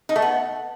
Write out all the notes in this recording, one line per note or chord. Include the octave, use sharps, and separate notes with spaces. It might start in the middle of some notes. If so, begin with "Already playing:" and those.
D#4
A3
B3